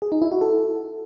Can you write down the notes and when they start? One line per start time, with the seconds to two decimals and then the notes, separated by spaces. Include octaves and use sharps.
0.02 G#4
0.12 D#4
0.22 E4
0.31 F#4
0.41 A4